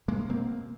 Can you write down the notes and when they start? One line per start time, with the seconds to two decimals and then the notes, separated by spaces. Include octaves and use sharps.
0.08 B2 G#3 A#3
0.29 B2 A#3 C4